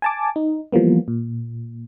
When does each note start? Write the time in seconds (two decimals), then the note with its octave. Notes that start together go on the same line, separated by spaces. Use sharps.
0.02 G#5 A5 D6
0.36 D#4
0.72 E3 F3 G3 A#3 B3
1.08 A#2